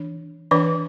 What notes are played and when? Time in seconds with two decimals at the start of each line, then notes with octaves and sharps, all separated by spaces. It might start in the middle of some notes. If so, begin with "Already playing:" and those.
Already playing: E3 D4
0.51 E3 D4 B4 D5